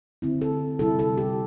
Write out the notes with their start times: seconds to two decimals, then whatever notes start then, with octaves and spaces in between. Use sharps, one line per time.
0.22 D3 C4 E4
0.42 A4
0.79 C3 G3 E4 A4
0.99 A4
1.18 G4